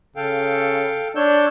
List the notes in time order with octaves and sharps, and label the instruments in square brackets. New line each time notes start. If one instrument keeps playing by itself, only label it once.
[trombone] C#3 [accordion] A4 F5 G5
[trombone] D4 [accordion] C#5 E6 G6